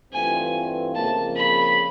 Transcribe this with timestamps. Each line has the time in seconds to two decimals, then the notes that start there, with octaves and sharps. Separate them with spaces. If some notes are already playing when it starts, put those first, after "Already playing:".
0.12 G2 E3 A3 C4 F4 G#5
0.95 F2 C#3 F3 A#3 A5
1.36 B5